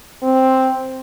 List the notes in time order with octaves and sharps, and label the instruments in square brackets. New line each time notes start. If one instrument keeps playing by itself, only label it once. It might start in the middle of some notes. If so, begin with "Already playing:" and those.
[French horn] C4